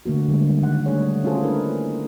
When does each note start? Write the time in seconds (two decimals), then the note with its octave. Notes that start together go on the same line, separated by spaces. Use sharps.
0.06 D3 A3 A#3 F#4
0.28 D3 G3 G#3
0.62 D#3 F#5
0.86 G3 A3 D4 G#4 C#5
1.24 C#4 F4 F#4 G#4 A4 C5
1.43 A3 A#3 D4 E4 A#4 B4